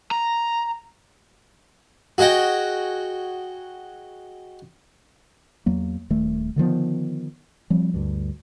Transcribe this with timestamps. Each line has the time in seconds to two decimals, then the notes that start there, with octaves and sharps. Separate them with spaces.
0.11 A#5
2.18 F#4 G#4 D#5 F#5 G5
5.66 E2 F#3 A#3
6.10 D#1 D#3 A3
6.56 D3 D#3 F3 B3
7.70 F3 G3 C4
7.94 D2 G2